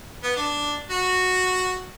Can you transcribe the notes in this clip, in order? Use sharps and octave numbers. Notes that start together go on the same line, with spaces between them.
B3
D4
F#4